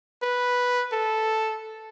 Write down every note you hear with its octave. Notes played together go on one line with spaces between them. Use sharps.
B4
A4